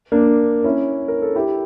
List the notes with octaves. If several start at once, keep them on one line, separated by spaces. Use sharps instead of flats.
A#3 D4
C#4 E4
A#4
A4
E4 G4